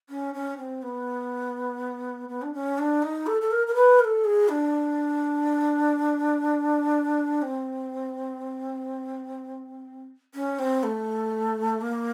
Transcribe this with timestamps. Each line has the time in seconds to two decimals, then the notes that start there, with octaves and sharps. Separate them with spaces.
0.09 C#4
0.34 C#4
0.58 C4
0.82 B3
2.29 B3
2.42 D4
2.53 C#4
2.78 D4
3.02 D#4
3.27 A4
3.41 A4
3.51 A#4
3.67 A#4
3.75 B4
4.00 A#4
4.04 A4
4.24 G#4
4.49 D4
7.42 C4
10.35 C#4
10.59 C4
10.83 A3
11.81 A#3